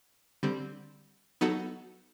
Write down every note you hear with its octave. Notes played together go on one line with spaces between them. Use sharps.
D3 G3 C4
F#3 B3 D#4 F#4 A4